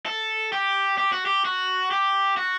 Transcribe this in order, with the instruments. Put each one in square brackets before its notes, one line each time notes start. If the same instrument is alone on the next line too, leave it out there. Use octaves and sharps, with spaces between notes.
[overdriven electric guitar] A4
G4
G4
F#4
G4
F#4
G4
F#4